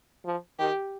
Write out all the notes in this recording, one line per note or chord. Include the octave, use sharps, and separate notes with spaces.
F3
D#3 G4